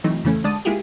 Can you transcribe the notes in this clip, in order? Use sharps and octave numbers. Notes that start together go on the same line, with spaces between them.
C3 E3 F#3 A3 D#4
F2 C#3 E3 A3 C#4
D3 G#3 D5 A5 D#6
G#3 A#3 E4 F4 G4 G#4